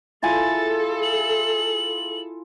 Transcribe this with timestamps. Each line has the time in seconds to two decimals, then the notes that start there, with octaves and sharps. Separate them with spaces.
0.23 E4 F4 G#4 A4 G#5 A6
1.03 F#7